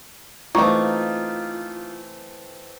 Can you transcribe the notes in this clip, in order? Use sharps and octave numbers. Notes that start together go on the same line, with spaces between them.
E3 A3 A#3 C4 D#4 F4 C#6